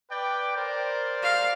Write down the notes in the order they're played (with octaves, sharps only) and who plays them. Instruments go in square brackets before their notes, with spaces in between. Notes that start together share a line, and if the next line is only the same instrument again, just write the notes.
[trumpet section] B4 D5 G5
A#4 C5 D5
[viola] F5